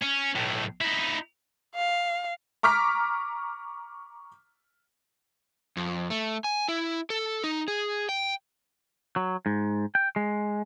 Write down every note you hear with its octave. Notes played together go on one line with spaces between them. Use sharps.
C#4
B1 A2
D#4 E4
F5
A#5 C#6 D6 F6 B6
F2
A3
G#5
E4
A4
D#4
G#4
G5
F#3
G#2
G5
G#3